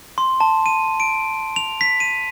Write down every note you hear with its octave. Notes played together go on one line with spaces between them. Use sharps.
C6
A5
D#7
D7
F7
B6
D#7